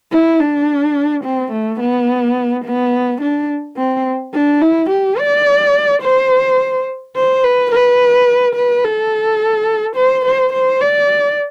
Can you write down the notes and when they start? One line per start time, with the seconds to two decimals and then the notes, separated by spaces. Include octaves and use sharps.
0.12 E4
0.40 D4
1.24 C4
1.52 A3
1.80 B3
2.65 B3
3.21 D4
3.77 C4
4.34 D4
4.62 E4
4.90 G4
5.19 D5
6.02 C5
7.16 C5
7.44 B4
7.72 B4
8.56 B4
8.84 A4
9.96 C5
10.26 C5
10.53 C5
10.81 D5